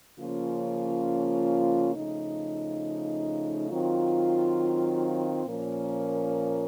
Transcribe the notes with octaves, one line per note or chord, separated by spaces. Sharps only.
C#3 F3 A#3 C#4 F4
C#3 F3 A3 D#4
D#3 F#3 C4 F4
A#2 F3 A#3 C#4